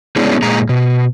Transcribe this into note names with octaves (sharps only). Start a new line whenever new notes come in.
G#3 B3 C#4 D4 E4 G#4
A#2 G#3 A#5
B2